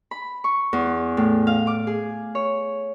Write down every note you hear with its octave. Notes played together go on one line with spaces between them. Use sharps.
B5
C#6
E2
A2
F5
D6
G#4
C#5